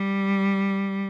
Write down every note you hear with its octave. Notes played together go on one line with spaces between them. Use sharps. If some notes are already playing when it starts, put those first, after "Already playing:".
Already playing: G3